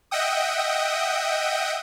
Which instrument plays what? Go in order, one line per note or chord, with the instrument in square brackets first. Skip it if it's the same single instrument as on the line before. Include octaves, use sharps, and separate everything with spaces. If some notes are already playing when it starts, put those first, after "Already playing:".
[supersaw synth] D#5 E5 F#5 G5 D#6